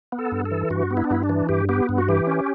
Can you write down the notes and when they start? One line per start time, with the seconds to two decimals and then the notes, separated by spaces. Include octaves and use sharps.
0.12 B3
0.19 A4
0.32 G2
0.45 A4
0.51 E3
0.70 G2 F#4
0.90 B3
0.97 E4
1.04 D4
1.10 G2 E4
1.23 D4
1.29 E3
1.49 G2 G4
1.69 B3 G4
1.89 G2
1.98 F#4
2.08 E3 G4
2.27 C#4